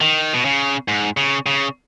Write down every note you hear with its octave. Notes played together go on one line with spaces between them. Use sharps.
D#3
B2
C#3
G#2
C#3
C#3